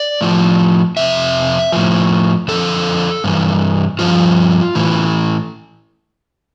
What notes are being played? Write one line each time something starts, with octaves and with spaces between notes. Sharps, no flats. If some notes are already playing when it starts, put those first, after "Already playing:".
Already playing: D5
A2 F3
F2 C3 F3 E5
A2 F3
F2 D3 F3 A4
G2 E3
G2 F3 F4
A2 E3